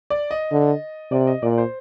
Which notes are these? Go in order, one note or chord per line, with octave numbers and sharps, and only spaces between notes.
D5
D#5
D3
C3 D5
D#5
A#2 D5
C5